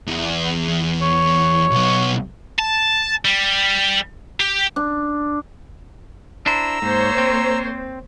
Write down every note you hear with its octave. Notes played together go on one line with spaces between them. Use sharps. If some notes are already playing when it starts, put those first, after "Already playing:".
E2
C#5
B1 B3
A5
G3
G4
D4
D4 E4 C5 A#5 E6
G#2 A#3 C5 C#5
C4